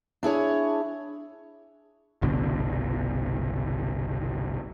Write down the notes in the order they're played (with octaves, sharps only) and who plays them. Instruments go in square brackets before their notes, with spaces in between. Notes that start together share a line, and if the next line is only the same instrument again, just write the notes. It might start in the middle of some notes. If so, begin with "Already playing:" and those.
[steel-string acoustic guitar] D4 E4 G#4 C#5
[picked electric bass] G1 C2 B2 D3